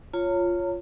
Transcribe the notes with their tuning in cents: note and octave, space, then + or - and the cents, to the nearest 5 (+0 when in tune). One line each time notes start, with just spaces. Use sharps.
F4 -5 C#5 +0 A#5 -40